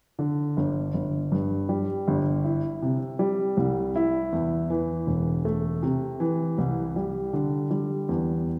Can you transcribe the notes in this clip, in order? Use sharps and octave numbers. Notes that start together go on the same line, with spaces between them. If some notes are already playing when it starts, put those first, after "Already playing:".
D3
G1
G1
G2
G3
G1
E4
C3
G3
C2
E4
E2
E3
E1
A3
C3
E3
C2
G3
D3
G3
E2